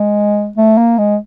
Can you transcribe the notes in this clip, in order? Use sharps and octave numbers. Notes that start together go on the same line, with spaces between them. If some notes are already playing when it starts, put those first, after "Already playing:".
Already playing: G#3
A3
A#3
G#3